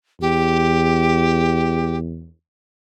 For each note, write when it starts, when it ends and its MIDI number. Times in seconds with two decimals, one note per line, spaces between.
0.21 2.30 40
0.21 1.98 67